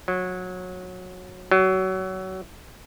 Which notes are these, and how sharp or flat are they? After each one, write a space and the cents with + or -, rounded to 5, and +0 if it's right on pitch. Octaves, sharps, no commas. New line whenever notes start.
F#3 -20
F#3 +25